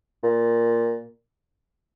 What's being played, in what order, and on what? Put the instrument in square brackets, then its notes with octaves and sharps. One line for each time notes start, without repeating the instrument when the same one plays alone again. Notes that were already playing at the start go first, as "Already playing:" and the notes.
[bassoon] A#2